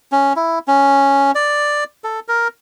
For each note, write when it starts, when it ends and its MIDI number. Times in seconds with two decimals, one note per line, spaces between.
0.12 0.33 61
0.36 0.59 64
0.68 1.31 61
1.35 1.84 74
2.04 2.20 69
2.28 2.48 70